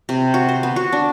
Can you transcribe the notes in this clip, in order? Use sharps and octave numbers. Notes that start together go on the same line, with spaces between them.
C3
F#4
C5
B3
F#4
D4